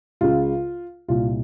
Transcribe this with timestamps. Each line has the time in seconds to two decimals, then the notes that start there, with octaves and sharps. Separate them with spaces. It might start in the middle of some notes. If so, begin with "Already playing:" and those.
0.21 C#2 C#3 F4
1.08 C2 A#2 F4